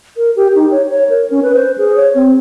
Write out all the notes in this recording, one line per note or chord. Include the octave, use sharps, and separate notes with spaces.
A#4
G4
D#4
C#5
C#5
A#4
C#4
B4
C5
G#4
C#5
C4